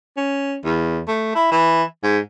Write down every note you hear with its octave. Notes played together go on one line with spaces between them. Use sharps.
C#4
E2
A3
E4
E3
G#2